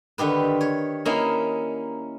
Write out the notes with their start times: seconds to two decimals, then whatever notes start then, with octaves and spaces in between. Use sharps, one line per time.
0.18 D3 D#3 G4 B4
0.61 C#5
1.05 A#3 C#4 D#4 E4